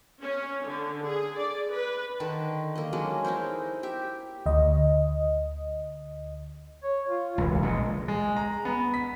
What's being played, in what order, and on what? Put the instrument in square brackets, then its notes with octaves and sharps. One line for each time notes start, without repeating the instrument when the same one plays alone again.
[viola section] C#4
D3
G#4
D5
B4
[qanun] D3 D#3 A5
A#3 D#5
F#3 G#3 C#4 D4
D#4 E4 A#4 C5
G4 E5
[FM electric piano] D2 D#5
[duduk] C#5
F4
[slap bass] E1 C#2 [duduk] E3
[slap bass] A#1 A#2 [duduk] G#3
[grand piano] G#3
A#5
B3
B6